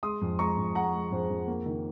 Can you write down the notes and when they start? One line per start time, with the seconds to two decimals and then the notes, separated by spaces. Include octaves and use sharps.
0.03 G#3 C6 D#6
0.21 F2
0.39 G#3 A#5 C#6
0.57 F2
0.75 G#3 F#5 A#5
0.93 G#3
1.12 F2 G#4 C5
1.30 F2
1.48 A#3
1.66 D#3